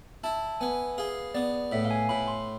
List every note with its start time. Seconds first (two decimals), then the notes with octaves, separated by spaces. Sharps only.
0.24 E4 A5
0.60 B3 G#5
0.98 G#4 F5
1.34 B3 D5
1.72 A2 E5
1.85 F5
1.91 G#5
2.09 A2 B5
2.28 C6